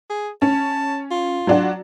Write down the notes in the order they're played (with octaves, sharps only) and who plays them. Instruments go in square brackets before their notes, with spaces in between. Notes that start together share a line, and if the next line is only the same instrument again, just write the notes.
[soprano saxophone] G#4
[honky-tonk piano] C#4 [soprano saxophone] A5
[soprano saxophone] F4
[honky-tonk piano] F#3 D4 F#4